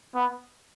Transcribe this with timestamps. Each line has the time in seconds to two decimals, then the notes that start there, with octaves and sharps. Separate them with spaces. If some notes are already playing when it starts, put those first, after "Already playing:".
0.15 B3